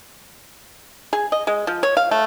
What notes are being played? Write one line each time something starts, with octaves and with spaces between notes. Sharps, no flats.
G#4
D#5
G#3
F3
C#5
F5
A3